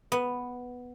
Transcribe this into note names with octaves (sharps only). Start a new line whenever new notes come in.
B3